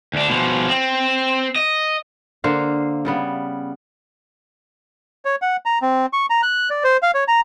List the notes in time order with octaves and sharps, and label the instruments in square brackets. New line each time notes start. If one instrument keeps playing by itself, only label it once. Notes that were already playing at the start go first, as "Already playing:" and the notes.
[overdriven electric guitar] D2 D4
B2 F3
C4
D#5
[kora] D3 A#3 C5 F5
C#3 G3 B3
[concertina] C#5
F#5
A#5
C4
C#6
A#5
F#6
D5
C5
F5
C#5
A#5